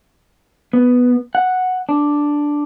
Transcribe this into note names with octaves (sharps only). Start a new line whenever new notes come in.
B3
F#5
D4